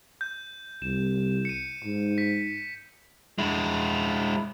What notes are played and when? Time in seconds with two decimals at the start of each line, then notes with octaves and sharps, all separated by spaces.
0.21 G6
0.82 C2 E7
1.45 C#7 D#7
1.84 G#2
2.18 B6
3.38 G#3 E4